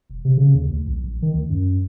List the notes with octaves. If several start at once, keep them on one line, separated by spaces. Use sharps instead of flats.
E1
C3
C#3
D#2
D2
B1
A#1
D#3
D2
F#2